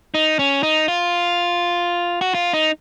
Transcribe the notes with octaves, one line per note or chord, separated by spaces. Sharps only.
D#4
C#4
D#4
F4
F#4
F4
D#4